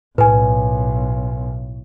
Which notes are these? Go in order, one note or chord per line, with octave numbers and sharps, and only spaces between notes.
B1 A2 B4 G#5